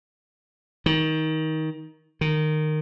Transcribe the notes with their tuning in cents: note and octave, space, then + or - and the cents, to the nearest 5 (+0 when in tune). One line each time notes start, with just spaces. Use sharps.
D#3 +20
D#3 -15